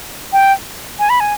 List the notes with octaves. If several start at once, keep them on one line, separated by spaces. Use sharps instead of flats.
G5
G#5
B5
G#5